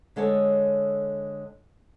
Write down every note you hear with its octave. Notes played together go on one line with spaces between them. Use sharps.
D3 G#3 A4 C#5